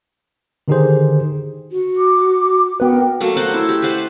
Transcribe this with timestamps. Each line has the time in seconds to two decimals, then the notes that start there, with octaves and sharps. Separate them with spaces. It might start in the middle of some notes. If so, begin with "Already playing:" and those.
0.68 D3 D#3 D#4 G4 G#4 C5
1.72 F#4
1.97 D6
2.80 B3 F#4 A#4 B4 F#5 G5
3.20 F#3 A3 A#3
3.37 C5 D#5 F#5 A5
3.54 E4
3.69 G4
3.82 B4 C5 F#5 A5